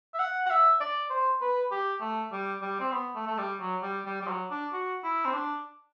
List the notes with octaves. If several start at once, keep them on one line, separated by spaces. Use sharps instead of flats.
E5
F#5
F#5
E5
D5
C5
B4
G4
A3
G3
G3
C4
B3
A3
A3
G3
F#3
G3
G3
G3
F#3
D4
F#4
E4
C4
D4